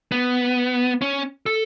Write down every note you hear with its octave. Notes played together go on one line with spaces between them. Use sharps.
B3
C#4
A4